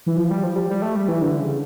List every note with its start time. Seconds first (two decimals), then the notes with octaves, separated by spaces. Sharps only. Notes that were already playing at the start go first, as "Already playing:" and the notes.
0.06 E3
0.17 F3
0.31 G3
0.43 F3
0.56 G3
0.70 G3
0.82 A3
0.96 G3
1.08 E3
1.22 D3
1.40 C#3